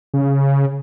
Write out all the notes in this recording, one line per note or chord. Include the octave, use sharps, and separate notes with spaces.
C#3